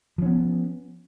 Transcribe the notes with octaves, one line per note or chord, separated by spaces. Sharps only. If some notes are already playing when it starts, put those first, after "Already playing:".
F3 B3 C#4